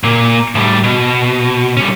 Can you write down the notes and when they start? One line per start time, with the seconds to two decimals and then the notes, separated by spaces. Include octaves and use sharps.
0.04 A#2 A#3
0.55 A2 G3
0.84 B2
1.77 G3 C#4